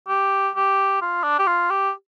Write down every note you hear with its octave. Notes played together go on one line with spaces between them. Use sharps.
G4
G4
F4
D4
G4
F4
G4